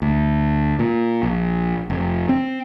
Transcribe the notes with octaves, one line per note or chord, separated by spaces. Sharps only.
D2
A#2
A#1
F1
C4